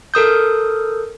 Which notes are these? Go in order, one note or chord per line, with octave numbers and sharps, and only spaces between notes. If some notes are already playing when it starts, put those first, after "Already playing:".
A4 A#4 D#6 G6